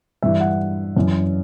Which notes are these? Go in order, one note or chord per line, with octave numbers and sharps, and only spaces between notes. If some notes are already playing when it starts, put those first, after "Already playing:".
G2 E3 E5
F#5
F#2 E3